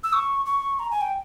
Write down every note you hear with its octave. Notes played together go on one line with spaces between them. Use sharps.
E6
C#6
C#6
A#5
G#5
G5